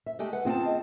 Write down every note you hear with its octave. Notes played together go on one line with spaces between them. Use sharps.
E5
G#3 A3 G4
B4 F#5
C4 F4 G#4 F#5 A5
D#5